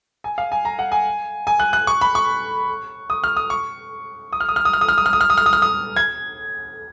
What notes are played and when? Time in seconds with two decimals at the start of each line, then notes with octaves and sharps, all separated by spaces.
0.24 G#5
0.38 F5
0.52 G#5
0.65 A#5
0.79 F#5
0.92 G#5
1.47 G#5
1.60 F#6
1.73 F#6
1.87 C#6
2.01 B5
2.15 C#6
3.10 D#6
3.24 F6
3.37 D#6
3.50 C#6
4.33 D#6
4.40 F6
4.49 D#6
4.56 F6
4.65 D#6
4.73 F6
4.81 D#6
4.88 F6
4.98 D#6
5.06 F6
5.13 D#6
5.21 F6
5.30 D#6
5.38 F6
5.46 D#6
5.53 F6
5.62 D#6
5.97 G#6